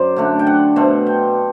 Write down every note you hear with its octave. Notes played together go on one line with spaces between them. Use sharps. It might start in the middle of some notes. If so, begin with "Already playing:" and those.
Already playing: F#2 C5 D5
D3 A3 D4
G5
F#5
B2 A3 C4
G5